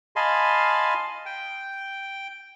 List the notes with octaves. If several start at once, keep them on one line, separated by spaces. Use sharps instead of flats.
D#5 F5 G#5 A5 B5 C6
G5